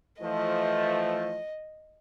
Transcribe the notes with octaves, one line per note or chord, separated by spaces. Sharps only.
E3 F3 A3 D#5